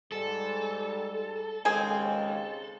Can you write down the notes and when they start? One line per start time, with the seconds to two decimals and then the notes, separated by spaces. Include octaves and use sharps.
0.12 G#2 G3 A4
1.65 D#2 C#3 G#3 C4 G#4 G#5